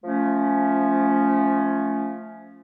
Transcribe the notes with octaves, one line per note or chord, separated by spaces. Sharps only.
F3 A3 C#4